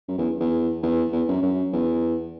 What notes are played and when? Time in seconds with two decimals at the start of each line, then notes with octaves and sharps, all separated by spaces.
0.09 F#2
0.18 E2
0.40 E2
0.83 E2
1.12 E2
1.28 F#2
1.43 F#2
1.73 E2